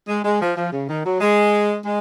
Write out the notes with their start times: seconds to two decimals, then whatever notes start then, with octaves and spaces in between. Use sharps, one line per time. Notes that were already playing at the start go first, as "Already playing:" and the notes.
0.08 G#3
0.24 G#3
0.41 F3
0.57 F3
0.73 C#3
0.89 D#3
1.06 F#3
1.21 G#3
1.86 G#3